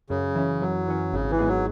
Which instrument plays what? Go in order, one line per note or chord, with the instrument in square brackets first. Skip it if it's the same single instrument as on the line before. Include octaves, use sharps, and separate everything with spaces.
[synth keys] F#2 [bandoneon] C#3
[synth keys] E3 C#4
[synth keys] F#2 [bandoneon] F#3
[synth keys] E3 C#4
[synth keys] G#1 [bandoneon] C#3
[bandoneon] E3
[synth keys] G#2 G#3 B3 G#4
[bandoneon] F#3